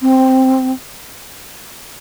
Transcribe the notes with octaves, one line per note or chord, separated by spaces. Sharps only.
C4